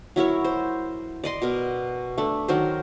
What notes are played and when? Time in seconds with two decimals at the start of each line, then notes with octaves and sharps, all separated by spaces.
0.16 F#3 E4 A#4 C#5
0.44 C5
1.24 D5 D#5 C6
1.42 B2 A#4
2.18 A3 D4
2.48 D#3 F#3 A#4 C5